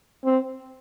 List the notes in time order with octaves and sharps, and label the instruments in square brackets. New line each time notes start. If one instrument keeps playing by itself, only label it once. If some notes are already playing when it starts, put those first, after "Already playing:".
[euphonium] C4